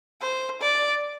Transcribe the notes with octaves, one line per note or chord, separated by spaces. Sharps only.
C5
D5